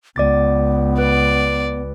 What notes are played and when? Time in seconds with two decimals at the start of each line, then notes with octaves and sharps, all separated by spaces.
0.16 C#2 B3 D5 D6 A6
0.98 B4 D5